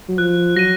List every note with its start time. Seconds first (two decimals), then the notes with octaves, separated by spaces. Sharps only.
0.09 F#3
0.18 F3 F#6
0.56 F#3 A#6 D#7